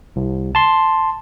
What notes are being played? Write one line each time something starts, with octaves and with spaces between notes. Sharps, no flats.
C2
A5 C6